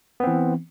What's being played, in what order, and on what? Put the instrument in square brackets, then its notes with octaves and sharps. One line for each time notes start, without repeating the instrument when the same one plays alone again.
[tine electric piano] B3
C4
E3